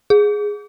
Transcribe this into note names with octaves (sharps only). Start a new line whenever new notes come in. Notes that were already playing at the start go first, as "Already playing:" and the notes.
G#4